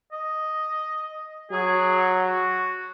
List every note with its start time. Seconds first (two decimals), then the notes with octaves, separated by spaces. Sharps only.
0.12 D#5
1.51 F#3 G#4
2.27 F#4